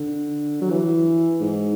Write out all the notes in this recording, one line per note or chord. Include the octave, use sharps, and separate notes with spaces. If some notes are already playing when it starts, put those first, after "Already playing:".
Already playing: D3
F#3
E3
G#2